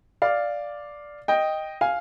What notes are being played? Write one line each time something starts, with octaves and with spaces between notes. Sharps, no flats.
D5 F5
D#5 G5
F5 G#5